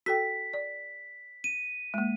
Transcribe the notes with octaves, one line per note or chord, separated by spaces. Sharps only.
F#4 A4 G5 B6
D5
D#7
G#3 A#3